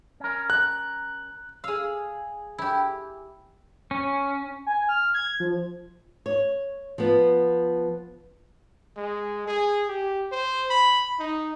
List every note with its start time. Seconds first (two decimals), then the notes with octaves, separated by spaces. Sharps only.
0.20 C#4 A#4
0.50 F#6
1.64 G#4 F5 E6
2.58 E4 G4
3.91 C#4
4.66 G#5
4.89 F6
5.14 G#6
5.40 F3
6.26 C#5
6.98 F3 B3
8.97 G#3
9.48 G#4
9.88 G4
10.32 C5
10.70 B5
11.20 D#4